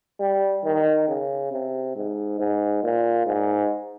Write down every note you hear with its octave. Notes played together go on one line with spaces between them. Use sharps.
G3
D#3
C#3
C3
G#2
G#2
A#2
G#2